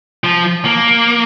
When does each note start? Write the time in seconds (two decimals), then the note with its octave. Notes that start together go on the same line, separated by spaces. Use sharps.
0.24 F3
0.65 A#3